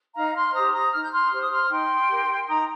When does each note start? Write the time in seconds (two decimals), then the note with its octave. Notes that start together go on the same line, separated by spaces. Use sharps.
0.15 D#4 F5 A#5
0.34 C6 F6
0.54 G4 C5 A#5 D#6
0.73 A#5 D#6
0.92 D#4 F6
1.02 G6
1.12 C6 F6
1.31 G4 C5 F6
1.41 D#6
1.51 C6 F6
1.69 D#4 G5 C6
2.08 G4 A#4
2.47 D#4 A#5 D#6